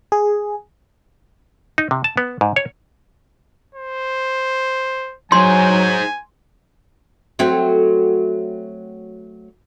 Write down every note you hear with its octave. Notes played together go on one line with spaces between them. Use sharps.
G#4
D#4
C3
A5
B3
G#2
C#5
C5
F#3 D#4 G#4 C5 G#5 C6
F#3 A3 C4